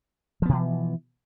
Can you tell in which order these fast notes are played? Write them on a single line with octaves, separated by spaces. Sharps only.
F3 B3 B2 E3